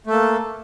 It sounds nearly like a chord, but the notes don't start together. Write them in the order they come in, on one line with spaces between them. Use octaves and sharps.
A3 A4 A#3